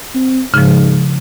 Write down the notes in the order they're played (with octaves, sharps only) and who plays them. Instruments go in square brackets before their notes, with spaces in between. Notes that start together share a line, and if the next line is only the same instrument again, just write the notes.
[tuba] C4
[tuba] G#2 [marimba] C#3 F3